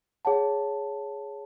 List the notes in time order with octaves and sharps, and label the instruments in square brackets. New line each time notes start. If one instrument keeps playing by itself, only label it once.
[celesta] G#4 C#5 F#5 A5